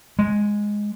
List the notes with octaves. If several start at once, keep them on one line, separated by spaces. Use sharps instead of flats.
G#3